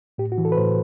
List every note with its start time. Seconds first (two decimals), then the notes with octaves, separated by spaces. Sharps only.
0.18 A2 G4
0.32 F#4
0.38 E3
0.45 A4
0.52 B4
0.57 A2 C5